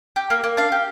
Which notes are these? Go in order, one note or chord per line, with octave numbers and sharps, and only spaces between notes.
G4
A#3
A#3
D4 F5
G4